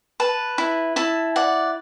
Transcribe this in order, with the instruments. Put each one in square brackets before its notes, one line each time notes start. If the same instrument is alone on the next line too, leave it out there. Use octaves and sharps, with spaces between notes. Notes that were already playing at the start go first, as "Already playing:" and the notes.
[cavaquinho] B4 A5
E4
E4 A5
D5 F#5